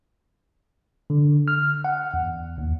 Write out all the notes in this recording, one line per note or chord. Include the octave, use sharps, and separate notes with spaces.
D3
F6
F#5
E2
D#2